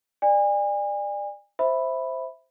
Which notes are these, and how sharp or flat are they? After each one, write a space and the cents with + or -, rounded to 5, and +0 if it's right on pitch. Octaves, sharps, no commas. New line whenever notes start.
D5 +20 G#5 -35
C5 +0 E5 +0 B5 +0